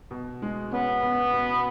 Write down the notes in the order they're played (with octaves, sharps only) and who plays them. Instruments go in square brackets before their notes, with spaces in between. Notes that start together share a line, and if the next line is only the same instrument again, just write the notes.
[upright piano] B2
G#3
[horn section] B3 [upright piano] C#4
[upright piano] B2
B2